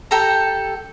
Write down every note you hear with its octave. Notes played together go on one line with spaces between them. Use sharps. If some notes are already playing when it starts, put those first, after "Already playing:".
G4 A4 A#5